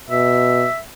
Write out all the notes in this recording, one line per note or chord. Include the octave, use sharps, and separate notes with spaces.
B2 E5